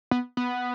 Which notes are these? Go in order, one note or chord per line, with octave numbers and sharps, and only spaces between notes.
B3
B3